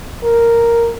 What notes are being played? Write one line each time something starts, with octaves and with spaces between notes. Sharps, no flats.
A#4